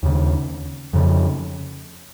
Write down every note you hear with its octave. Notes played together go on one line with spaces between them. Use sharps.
D#2 C#3
F2 C#3